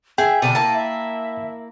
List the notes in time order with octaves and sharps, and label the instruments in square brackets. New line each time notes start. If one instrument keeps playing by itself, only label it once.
[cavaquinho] G#4 [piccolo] E5 [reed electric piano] G5
[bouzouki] B2 D3 D4 [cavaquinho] D5 [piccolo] D#7
[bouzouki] A#3 E4 [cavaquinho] A5
[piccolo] E5